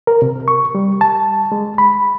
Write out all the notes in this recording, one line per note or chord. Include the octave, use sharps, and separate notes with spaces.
A#4
C3
C#6
G3
A5
G#3
B5